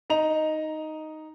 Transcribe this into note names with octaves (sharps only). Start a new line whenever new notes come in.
D#4 D#5 A#5 F7